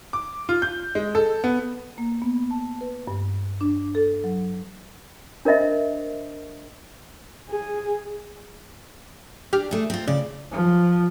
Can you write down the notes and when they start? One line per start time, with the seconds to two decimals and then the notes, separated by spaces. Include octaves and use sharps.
0.13 D6
0.49 F4
0.62 G6
0.95 G#3
1.15 A4
1.44 B3
1.98 A#3
2.22 B3
2.51 A5
2.81 B4
3.07 G2
3.61 D4
3.95 A4
4.24 F#3
5.45 D4 A#4 C5 D#5 E5
7.50 G#4
9.53 D4 G4 F6
9.71 A3 G#4
9.90 C4 F4
10.08 C#3 D5
10.51 F3